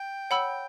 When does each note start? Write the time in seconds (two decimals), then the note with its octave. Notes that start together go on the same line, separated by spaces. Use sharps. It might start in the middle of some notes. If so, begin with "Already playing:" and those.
Already playing: G5
0.30 C#5 F#5 B5 E6